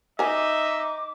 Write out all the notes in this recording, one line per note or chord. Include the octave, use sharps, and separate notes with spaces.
D#4 A#4 D#5 E5 G#5 D6